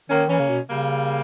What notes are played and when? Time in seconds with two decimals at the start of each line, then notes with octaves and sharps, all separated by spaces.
0.09 D#3 A#3 C#4
0.29 E3 A#3 C#4
0.39 C#3
0.49 B2
0.68 C#3 G3 A#3